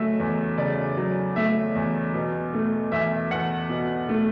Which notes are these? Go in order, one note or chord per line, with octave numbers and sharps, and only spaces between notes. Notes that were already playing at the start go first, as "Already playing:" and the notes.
Already playing: C#3 F#3 A3 E5
E2
C#3 D5
F#3
A3 E5
E2
B2
A3
E2 E5
E2 F#5
B2
A3